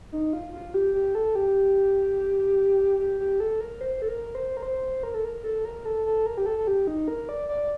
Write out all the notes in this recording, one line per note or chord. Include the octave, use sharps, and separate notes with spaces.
D#4
F4
F4
G4
G4
A4
G4
G4
G4
A4
A#4
C5
A4
A#4
C5
A#4
C5
A#4
A4
A#4
A4
A#4
A4
A4
A#4
G4
A4
A4
G4
D#4
A#4
D5
D5